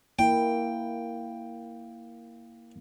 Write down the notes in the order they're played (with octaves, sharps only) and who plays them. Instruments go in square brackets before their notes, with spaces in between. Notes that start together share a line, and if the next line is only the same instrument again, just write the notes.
[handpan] A#3 E4 [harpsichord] G5